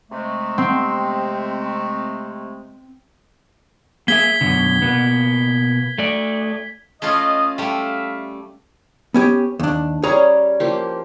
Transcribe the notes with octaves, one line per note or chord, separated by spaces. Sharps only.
C3 G#3 A3
C4
A#3 G#4 E5 G#6 B6 G7
F#2 B2 D3
B2 A#3 B3
A3 D5
A3 C#4 F4 D#5
G3 A3 A4 E5 F5
B3 C#4 G4
D#2 D4
G3 C#4 G#4 C#5 A#5
F3 A#3 G4